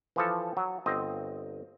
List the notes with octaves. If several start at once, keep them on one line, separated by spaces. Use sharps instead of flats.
E3 F3 A4
F#3
G1 C4 D#5